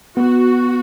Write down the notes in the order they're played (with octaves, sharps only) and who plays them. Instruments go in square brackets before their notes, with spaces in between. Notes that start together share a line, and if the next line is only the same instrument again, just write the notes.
[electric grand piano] B3 [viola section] F#4